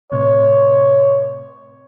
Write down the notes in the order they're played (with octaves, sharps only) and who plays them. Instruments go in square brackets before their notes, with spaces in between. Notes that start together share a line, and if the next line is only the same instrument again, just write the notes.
[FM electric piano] A2 C3 [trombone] C#5